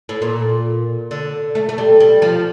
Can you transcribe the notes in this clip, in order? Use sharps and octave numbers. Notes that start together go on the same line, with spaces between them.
A2
A#2
D3
A3
A3
G3
G3
F3